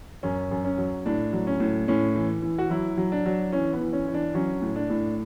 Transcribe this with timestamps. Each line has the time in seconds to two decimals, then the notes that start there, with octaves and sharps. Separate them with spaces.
0.23 F#2 C#4
0.51 F#2
0.65 C#4
0.78 F#3
1.06 A2 D4
1.33 F#3
1.47 C#4
1.60 A2
1.88 A2 C#4
2.15 E3
2.42 E3
2.58 F#4
2.70 F#3 E4
2.97 F#3
3.12 D4
3.26 F#3
3.52 E3 C#4
3.73 B3
3.81 E3
3.93 C#4
4.08 E3
4.14 D4
4.35 F#3 C#4
4.62 A2
4.76 D4
4.90 A2